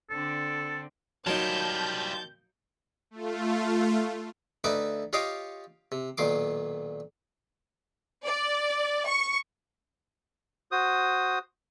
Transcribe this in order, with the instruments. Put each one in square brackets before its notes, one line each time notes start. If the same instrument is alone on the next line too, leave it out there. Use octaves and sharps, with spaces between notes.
[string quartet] D3 C4 D4 [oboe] A4
[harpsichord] F#3 A#3 D#4 [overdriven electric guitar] G3 F4 [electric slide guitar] A5 [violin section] G6
[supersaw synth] A3 F4
[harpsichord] D2 D#4 B4 E5 D6
F4 G4 C#5 D#5 F5 D6
C3
B1 A#2 D#3 C6 D6
[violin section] D5
C#6
[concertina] F#4 C5 D#6